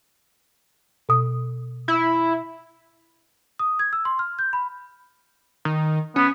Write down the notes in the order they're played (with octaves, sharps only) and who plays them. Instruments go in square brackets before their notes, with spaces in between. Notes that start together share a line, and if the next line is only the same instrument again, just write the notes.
[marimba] B2 D#6
[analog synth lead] E4
[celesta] D#6
G#6
E6
C6
F6
G6
B5
[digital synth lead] D#3
[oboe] B3 [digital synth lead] C#4